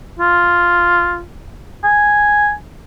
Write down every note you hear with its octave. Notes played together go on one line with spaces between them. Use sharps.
F4
G#5